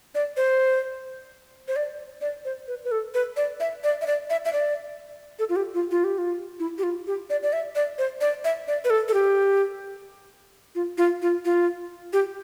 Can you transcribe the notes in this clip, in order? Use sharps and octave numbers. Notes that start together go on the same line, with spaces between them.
D5
C5
C5
D5
D5
C5
B4
B4
A4
B4
D5
E5
D5
E5
D5
E5
E5
D5
A4
F4
G4
F4
F4
G4
F4
E4
G4
F4
G4
D5
D5
E5
D5
C5
D5
E5
D5
B4
A4
A4
G4
F4
F4
F4
F4
G4